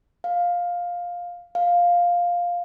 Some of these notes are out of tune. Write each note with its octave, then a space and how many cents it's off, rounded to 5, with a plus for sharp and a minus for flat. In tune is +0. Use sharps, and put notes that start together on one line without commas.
F5 +10
F5 +5